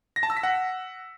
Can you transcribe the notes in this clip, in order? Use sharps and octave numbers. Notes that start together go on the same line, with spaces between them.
A#6
A5
E6
B6
F#5